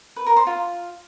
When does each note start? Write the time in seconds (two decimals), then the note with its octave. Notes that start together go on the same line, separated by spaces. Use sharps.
0.16 B4
0.26 A#4
0.37 C5
0.47 F4